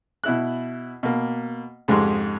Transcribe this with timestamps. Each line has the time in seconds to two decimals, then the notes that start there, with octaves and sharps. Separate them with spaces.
0.24 B2 E4 F#6
1.03 B2 A#3
1.88 F2 G#2 C#3 G#3 G4 C6